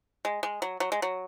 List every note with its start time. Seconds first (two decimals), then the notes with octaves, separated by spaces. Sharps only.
0.25 G#3
0.43 G#3
0.62 F#3
0.80 F#3
0.92 G#3
1.02 F#3